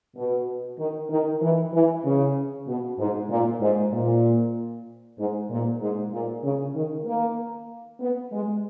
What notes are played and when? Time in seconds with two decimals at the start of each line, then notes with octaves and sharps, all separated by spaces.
0.16 B2
0.79 D#3
1.10 D#3
1.42 E3
1.74 E3
2.04 C#3
2.67 B2
2.99 G#2
3.30 A#2
3.61 G#2
3.93 A#2
5.18 G#2
5.50 A#2
5.81 G#2
6.13 A#2
6.44 C#3
6.75 D#3
7.06 A#3
8.01 B3
8.32 G#3